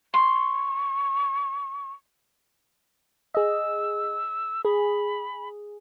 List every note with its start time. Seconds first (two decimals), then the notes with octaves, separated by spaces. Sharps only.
0.14 C6 C#6
3.35 G#4 D#5 E6
4.65 G#4 B5